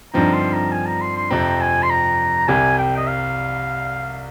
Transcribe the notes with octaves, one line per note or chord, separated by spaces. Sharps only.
G2 D3 F3 C4 D#4 A#5
C6
A#5
G#5
A#5
C6
C6
F2 C3 F3 C4 A#5
G#5
C6
A#5
C2 C3 G3 G#5
G5
D#5
F5